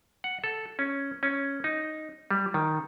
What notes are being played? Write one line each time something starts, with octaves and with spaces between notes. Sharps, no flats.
F#5
A4
C#4
C#4
D#4
G3
D#3